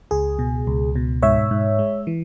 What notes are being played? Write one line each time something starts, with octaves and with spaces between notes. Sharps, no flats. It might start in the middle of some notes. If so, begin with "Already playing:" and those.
C#2 G#4
B2
C#2
B2
G#2 C#5 E5
G#2
G#3
E3